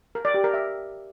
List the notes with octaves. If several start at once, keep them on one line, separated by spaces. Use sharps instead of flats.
A#4
D5
G4
A#4
E5